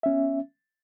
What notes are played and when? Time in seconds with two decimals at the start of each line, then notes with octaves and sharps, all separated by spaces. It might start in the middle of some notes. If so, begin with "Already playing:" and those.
0.03 E5
0.06 C#4
0.08 B3